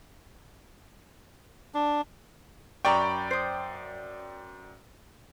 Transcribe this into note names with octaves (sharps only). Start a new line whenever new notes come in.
D4
F#2 D5 G5 A#5 B5 C#6
C5 D#6